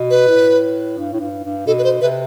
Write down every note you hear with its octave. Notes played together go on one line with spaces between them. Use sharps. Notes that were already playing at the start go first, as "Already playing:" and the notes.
Already playing: B2
B4
A2
G2
A2
G2
G2
B2 A4
B4
C5
C3 B4